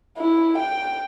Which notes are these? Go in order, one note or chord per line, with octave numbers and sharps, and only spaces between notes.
E4
G5